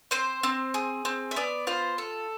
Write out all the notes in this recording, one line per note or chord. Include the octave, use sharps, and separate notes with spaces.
C4 C5
C4
G#4
C4
E5
B3 D5
F4 C5
A4